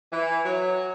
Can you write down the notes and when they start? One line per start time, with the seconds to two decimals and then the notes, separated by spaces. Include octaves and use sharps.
0.12 E3
0.45 F#3